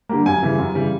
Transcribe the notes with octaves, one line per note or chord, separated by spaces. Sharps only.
D3 G3 A#3
F#2 G#5
C#3 E3 G3
F#2
C#3 E3 G3